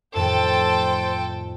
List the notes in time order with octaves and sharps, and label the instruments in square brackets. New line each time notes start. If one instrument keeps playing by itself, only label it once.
[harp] F2 A2 D#3 [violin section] A4 G5 [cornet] C5